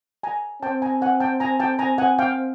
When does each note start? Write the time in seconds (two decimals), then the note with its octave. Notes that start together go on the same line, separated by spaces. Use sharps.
0.23 G#5 A#5
0.62 C4 G5 A5
0.82 G#5 A#5
1.01 F#5 G#5
1.20 G5 A5
1.40 G#5 A#5
1.60 G5 A5
1.79 G#5 A#5
1.98 F#5 G#5
2.19 F5 G5